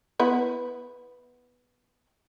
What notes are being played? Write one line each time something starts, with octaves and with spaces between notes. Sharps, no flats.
B3 E4 B4